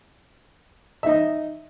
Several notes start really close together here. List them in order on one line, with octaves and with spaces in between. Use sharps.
E5 D#4 D#5